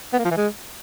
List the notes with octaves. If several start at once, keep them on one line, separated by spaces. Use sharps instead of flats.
B3
A#3
F3
E3
G#3